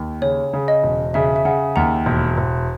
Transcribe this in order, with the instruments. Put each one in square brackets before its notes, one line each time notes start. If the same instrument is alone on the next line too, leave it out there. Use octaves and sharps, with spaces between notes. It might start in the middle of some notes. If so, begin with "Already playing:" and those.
Already playing: [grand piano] D#2
[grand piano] C#3 [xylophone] C#5
[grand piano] C#3
[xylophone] D#5
[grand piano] E1
[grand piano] C#3 [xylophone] E5
[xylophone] E5
[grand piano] C#3 [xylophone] F#5
[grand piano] D#2 [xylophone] F#5 A#5
[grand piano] E1
E1